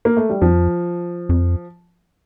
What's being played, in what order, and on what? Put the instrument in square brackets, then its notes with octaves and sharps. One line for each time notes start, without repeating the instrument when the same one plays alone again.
[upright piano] A#3
A3
G3
[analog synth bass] F2 [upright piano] F3
[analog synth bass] F2